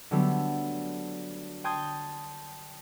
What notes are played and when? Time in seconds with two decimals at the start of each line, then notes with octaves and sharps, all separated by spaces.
0.11 D3 F#3 G3 A3 B3
1.64 G5 A5 C6 D#6 G6 G#6